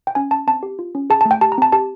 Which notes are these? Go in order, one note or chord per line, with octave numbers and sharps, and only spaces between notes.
G5
C#4 G#5
C#4 A5
C4 A5
G4
F4
C#4
G#4 A5
A3 A5
G5
G4 A5
A#5
C4 A5
G4 A5